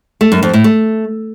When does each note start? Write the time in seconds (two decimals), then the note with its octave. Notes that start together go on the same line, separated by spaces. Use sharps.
0.21 A3
0.32 F#2
0.43 F2
0.53 A2
0.64 A3